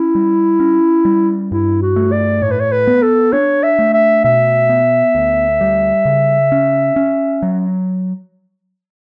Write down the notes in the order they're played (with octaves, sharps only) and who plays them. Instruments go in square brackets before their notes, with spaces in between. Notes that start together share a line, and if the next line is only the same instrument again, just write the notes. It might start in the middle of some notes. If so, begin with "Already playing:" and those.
Already playing: [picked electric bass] C#4 [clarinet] E4
[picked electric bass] G3
C#4
G3
[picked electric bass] G2 [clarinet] E4
[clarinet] F#4
[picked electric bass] A3
[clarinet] D5
[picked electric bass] A2 [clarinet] C#5
[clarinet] B4
C#5
B4
[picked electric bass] B3
[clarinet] A4
[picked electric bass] D4 [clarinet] C#5
[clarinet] E5
[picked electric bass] A3
[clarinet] E5
[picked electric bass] B2 [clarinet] E5
[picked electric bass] B3
D2
G3
C#3
C#4
C#4
F#3